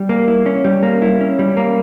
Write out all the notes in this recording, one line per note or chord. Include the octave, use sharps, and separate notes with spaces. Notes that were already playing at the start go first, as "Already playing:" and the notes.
Already playing: G3
A#3
E4
C#4
G3
A#3
E4
C#4
G3
A#3